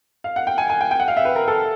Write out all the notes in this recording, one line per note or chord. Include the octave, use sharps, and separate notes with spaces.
F5
F#5
G5
G#5
G#5
G5
G5
F#5
F5
E5
B4
A#4
A4